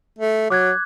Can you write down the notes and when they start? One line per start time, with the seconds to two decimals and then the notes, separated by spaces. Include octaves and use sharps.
0.19 A3
0.50 F#3 D6 F#6 G#6